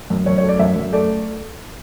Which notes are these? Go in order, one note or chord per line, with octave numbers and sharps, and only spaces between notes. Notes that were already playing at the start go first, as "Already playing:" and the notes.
F#2
F#2 C#5
C#5
A3
D5
F#2 E5
F#2
A3 D5